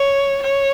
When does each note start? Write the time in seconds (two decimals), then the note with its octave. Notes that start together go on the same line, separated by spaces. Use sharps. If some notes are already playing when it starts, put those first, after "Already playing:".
Already playing: C#5
0.42 C#5